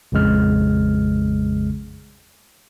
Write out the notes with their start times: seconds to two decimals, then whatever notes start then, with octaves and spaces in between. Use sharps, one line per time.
0.12 A#1 F2 C#3 G#3 F6